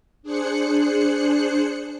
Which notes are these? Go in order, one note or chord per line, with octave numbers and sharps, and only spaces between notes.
D4 G#4 C5 F#6 C#7